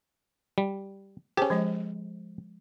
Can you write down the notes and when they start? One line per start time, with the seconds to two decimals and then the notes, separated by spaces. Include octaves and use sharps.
0.58 G3
1.37 C#4 G4 G#4 C5 A5
1.50 F3 G#3 D#5